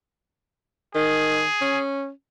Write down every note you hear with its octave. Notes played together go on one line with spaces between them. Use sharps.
D#3 G#4
C#4